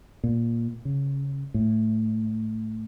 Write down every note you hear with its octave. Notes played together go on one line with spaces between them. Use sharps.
A#2
C#3
A2